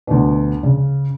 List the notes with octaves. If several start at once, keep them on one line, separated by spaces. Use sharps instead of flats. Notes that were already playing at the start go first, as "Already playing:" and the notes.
D2 B2
C#3